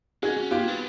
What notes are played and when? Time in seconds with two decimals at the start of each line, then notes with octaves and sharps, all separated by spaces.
0.23 C#4 F#4 G#4
0.37 C#4
0.51 B3 F4 G4
0.59 A#3
0.68 B3